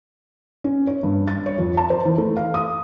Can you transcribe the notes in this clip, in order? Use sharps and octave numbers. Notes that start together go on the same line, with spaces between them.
C#4
C#5
G2
A6
C#5
F2
A5
C5
E3
A3
F5
D#6